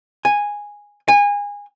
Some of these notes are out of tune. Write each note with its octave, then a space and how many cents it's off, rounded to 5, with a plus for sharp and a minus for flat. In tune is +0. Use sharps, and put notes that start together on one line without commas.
G#5 -10
G#5 -25